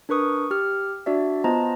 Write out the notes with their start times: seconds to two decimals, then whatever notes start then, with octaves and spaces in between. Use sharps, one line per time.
0.09 D4 A#4 B4 C#6 D#6
0.51 G4 F6
1.06 D4 F#4 D5 E5
1.44 B3 F4 C5 D#5 A5 A#5